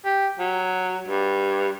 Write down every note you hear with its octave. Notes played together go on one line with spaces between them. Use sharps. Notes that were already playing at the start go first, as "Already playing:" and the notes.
G4
F#3
G2